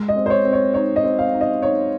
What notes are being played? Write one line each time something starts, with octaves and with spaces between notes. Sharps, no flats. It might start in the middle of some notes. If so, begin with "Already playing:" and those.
Already playing: G#3
D#5
C4
C5
C#5
C4
C#5
D#4 C#5
D#5
C4
F5
D#4
D#5
D#4 C#5